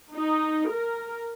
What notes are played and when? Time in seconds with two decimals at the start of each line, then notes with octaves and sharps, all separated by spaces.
0.15 D#4
0.71 A#4